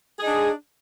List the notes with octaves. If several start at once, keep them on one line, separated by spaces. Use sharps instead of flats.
D4 D#4 G#4